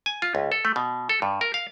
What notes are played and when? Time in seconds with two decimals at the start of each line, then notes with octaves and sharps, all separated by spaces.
0.06 G#5
0.22 F4
0.35 C#2
0.52 A4
0.65 A3
0.76 B2
1.09 A4
1.22 G2
1.41 A#4
1.54 F5